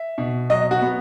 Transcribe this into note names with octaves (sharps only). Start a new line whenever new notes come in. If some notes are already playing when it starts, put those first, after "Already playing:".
Already playing: E5
B2
F#3 D#5
F#4
B3